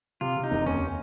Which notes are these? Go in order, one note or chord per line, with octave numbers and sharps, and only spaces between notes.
C3 F4
C3
D#4
F1
D#2 C#4